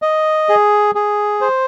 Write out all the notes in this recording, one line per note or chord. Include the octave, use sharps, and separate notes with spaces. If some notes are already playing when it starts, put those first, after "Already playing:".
D#5
G#4
G#4
C5